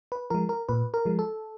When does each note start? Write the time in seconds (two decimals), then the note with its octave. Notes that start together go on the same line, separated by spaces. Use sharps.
0.12 B4
0.30 F3 G#3 A#4
0.49 A#4
0.69 A#2 B4
0.94 A#4
1.05 F3 G#3
1.19 A4